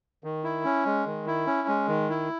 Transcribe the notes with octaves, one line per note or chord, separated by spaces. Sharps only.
D#3
E4
C#4
G#3
D#3
E4
C#4
G#3
D#3
E4